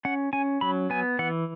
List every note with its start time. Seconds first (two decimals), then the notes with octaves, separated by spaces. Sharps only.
0.05 C#4 F#5
0.33 C#4 G#5
0.61 F#3 B5
0.90 B3 G#5
1.19 E3 F#5